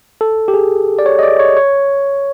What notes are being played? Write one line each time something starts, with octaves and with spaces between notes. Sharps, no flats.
A4
G4
G#4
D5
C#5
D#5
D5
C#5
C#5